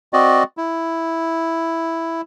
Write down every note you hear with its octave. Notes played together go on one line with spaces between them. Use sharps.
C4 F#4 D5 D#5
E4